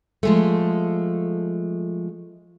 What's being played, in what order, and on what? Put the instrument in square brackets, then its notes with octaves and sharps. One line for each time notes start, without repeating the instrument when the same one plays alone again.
[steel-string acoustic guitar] F3 G#3 A3